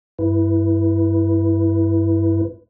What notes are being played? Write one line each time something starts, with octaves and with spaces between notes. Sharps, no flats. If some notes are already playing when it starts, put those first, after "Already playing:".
G2 E4 B4